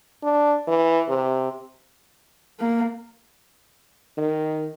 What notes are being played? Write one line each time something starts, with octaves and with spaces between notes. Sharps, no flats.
D4
E3
C3
A#3
D#3